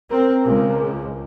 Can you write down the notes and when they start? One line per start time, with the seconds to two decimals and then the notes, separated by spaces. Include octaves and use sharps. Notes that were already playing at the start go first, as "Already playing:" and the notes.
0.10 C4 A#4
0.46 C#2